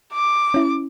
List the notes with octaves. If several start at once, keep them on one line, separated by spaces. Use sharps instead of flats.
D6
C#4 E4